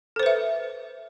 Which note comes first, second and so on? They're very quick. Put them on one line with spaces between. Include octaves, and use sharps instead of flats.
A4 C5 B4 E5